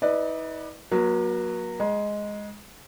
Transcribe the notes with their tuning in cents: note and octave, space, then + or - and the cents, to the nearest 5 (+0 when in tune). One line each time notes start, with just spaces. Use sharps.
D#4 +45 B4 +0 D5 +30
F#3 -10 A#3 +40
G#3 +0 A#5 +45